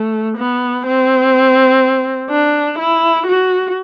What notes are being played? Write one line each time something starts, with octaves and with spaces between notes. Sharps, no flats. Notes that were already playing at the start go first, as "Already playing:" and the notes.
Already playing: A3
B3
C4
D4
E4
F#4